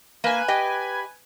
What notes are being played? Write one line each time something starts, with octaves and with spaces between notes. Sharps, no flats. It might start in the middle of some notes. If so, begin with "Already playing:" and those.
A#3 B4 G#5
G4 D#5 G5